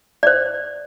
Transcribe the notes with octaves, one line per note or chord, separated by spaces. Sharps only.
C5 D5